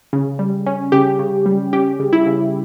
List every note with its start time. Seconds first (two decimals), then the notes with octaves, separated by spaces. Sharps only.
0.13 C#3
0.39 G3
0.66 C#4
0.92 C#3 G4
1.19 C#3
1.46 G3
1.73 C#4 G4
1.99 C#3
2.13 E4
2.26 C#3